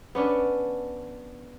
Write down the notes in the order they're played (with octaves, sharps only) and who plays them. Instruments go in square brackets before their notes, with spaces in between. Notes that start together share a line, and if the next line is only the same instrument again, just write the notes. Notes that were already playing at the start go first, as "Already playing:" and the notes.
[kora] B3 C#4 D4